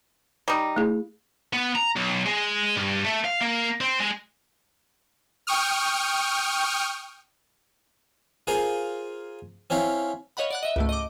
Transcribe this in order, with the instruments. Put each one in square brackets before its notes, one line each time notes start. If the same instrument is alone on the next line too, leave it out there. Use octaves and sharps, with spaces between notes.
[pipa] G3 D#4
[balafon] A3 E4 G#4
[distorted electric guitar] B3
A#5
B1
G#3
G2
A3
F5
A#3
C4
G#3
[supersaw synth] G5 C#6 D#6 F6
[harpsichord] F4 G#4 A#4 C5 F5 G#5
C4 C#4 E4 F5
[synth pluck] C#5 D#5 F5 F#5 B5
D5 F#5 F#6
D#5 E5
C#2 G#2 A3
D#5 D6